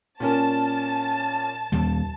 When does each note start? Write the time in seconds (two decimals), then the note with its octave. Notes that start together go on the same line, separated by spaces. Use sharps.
0.20 A#2 C#4 A#4 A5
1.72 D#2 G3